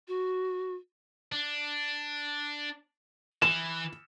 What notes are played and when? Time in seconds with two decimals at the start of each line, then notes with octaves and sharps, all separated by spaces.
0.08 F#4
1.32 D4
3.42 E3 E7